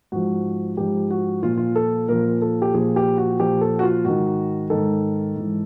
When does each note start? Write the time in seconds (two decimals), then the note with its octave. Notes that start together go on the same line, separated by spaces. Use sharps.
0.12 G#2 F3 F#4
0.77 G#2 F3 G4
1.10 F#4
1.43 A#2 F3 F4
1.58 F4
1.76 A4
2.08 A#2 F3 A#4
2.42 A4
2.62 G4
2.74 A#2 F3 G#4
2.96 G4
3.18 F#4
3.39 A#2 F3 G4
3.61 A4
3.79 F#4
3.83 F4
4.05 G#2 D#3 F#4
4.70 G#2 D#3 A4
5.36 G#2 E3